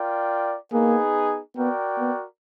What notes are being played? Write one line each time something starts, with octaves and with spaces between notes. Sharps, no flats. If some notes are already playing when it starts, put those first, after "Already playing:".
Already playing: F4 A#4 D5 G5
A#3 B3 D#4 G#4
B3 F#4 A#4 D5 G5
B3